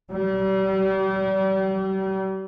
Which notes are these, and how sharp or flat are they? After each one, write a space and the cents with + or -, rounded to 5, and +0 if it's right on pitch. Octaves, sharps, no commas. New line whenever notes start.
G3 -35